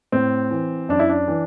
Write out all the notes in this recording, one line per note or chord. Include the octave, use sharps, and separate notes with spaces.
A2 C4
E3
F#2 D4
E4
D4
E3